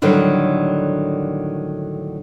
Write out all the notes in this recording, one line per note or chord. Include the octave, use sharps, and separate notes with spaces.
A2 D3 D#3 F#3 G3